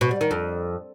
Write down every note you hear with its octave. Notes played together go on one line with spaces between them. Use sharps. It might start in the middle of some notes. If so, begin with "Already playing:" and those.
B2
G3
D#3
F2